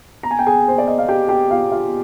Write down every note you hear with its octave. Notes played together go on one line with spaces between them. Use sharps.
A#5
G#5
G5
G#4 G#5
C5
D5
D#5
F5
G4 G5
G4 G5
F4 F5
F4 F5